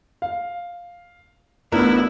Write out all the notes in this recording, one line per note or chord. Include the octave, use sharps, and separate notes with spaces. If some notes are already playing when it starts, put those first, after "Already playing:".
F5
A1 A2 B3 D4 E4 A#4